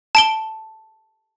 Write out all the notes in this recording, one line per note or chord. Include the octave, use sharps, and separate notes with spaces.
A5 D7 G7